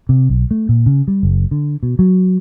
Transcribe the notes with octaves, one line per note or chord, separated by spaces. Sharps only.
C3
B1
A3
A#2
C#3
G3
F#1
D3
B2
F#3